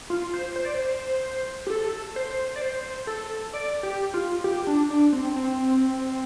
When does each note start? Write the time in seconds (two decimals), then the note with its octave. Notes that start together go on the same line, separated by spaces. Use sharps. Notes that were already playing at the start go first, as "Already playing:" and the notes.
0.10 F4
0.34 C5
0.56 C5
0.65 D5
0.75 C5
1.67 G4
1.70 A4
2.16 C5
2.56 D5
2.62 C5
3.07 A4
3.53 D5
3.83 G4
4.14 F4
4.44 G4
4.67 D4
4.90 D4
5.12 C4
5.36 C4